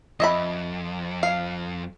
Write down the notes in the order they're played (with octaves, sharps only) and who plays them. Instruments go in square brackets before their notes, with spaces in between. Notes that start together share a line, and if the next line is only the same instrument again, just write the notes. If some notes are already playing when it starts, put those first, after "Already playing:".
[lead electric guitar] F2 [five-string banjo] D#5 E5 B5
[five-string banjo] F5